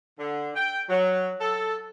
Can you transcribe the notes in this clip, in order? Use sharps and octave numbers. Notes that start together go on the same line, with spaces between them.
D3
G5
F#3
A4